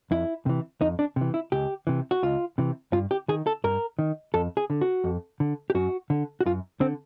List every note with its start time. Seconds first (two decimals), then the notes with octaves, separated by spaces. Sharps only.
0.11 F2 E4
0.46 C3 E3
0.81 F2 D#4
0.99 D4
1.16 C3
1.21 E3
1.34 E4
1.52 C#2 G4
1.87 C3 E3
2.11 F#4
2.23 C#2 F4
2.58 C3 E3
2.92 G2 F4
3.11 G4
3.28 D#3 G#4
3.47 A4
3.64 G2 A#4
3.99 D#3
4.34 F2 A4
4.57 G#4
4.70 D3
4.81 F#4
5.04 F2
5.40 D3
5.70 G4
5.75 F#2 F#4
6.10 D3
6.41 F#4
6.46 F#2 F4
6.80 D3 C4